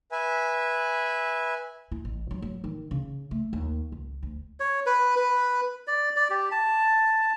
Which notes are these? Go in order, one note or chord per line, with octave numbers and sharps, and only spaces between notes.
B4 E5 G#5
E4
A1
F#3
F#3
D#3
C#3
A3
D#2
C#2
D2
C#5
B4
B4
D5
D5
G4
A5